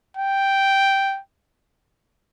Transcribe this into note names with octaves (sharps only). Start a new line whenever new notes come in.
G5